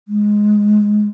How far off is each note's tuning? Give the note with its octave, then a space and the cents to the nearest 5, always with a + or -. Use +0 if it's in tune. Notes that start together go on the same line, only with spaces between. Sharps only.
G#3 +5